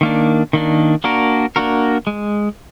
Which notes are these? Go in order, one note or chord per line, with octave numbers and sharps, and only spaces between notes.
D#3 A#3 D4
D#3 A#3 D4
A#3 D4 F#4 A#4
A#3 D4 F#4 A#4
G#3